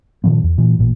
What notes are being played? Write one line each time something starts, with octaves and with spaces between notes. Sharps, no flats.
A#2 D#3 F3 B3
E2
A#2 E3
A1 A#2